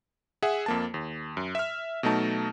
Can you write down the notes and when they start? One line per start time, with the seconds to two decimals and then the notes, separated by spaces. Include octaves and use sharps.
0.42 G#4 E5 F#5
0.66 F2 A#3 A5
0.94 D#2
1.37 F#2
1.55 E5 F6
2.03 B2 F#3 A3 D#4 A5